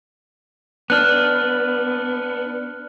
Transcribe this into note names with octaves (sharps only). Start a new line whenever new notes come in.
B3 D4 F6 F#6